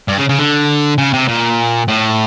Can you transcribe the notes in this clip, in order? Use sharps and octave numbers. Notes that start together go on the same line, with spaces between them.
G2
C#3
C#3
D3
C#3
C3
A#2
A2